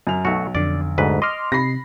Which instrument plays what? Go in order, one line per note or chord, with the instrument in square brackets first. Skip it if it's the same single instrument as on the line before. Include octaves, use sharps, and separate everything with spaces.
[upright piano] F#2 F7
[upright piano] B1 [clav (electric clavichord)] A3 F#4
[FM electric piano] F2 D3 [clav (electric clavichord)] D5
[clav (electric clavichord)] D2 G#2 B4
[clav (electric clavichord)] D#5 [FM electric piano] C6 D6 F6
[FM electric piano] C3 C7 [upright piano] B5 A#6